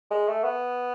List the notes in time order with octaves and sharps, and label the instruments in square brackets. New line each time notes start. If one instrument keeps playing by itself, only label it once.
[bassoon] G#3
A3
B3